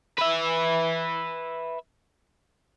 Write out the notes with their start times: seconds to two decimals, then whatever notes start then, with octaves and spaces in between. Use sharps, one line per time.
0.19 B4 E5